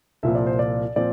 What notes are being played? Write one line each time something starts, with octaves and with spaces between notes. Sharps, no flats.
C2 A#2 F3 E5
D5
C5
D5
A#2 F3 C4 D5